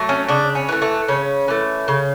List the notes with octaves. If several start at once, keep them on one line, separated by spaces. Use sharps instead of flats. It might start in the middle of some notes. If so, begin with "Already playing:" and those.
Already playing: F#3 A3
C#4
C#3 D4
C#4
E3 A3
A3
C#3 C#4
E3 A3
C#3